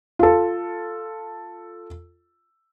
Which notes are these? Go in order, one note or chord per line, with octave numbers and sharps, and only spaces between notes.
F4 A4